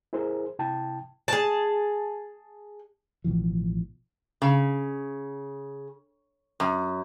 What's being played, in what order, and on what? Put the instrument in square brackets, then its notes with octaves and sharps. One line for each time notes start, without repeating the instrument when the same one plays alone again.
[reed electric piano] E4 G#4 A#4 C5
C3 E4 G5 A5
[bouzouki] G#4 A5
[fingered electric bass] A1 B2 E3 F3
[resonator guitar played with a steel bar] C#3
F#2